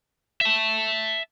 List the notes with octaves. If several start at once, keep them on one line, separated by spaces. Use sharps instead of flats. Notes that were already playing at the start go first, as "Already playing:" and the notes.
E5 A5